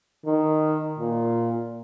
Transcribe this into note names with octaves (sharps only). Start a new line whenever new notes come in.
D#3
A#2